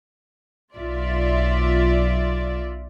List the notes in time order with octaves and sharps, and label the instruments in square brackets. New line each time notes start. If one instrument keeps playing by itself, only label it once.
[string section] B1 F4 D5 E5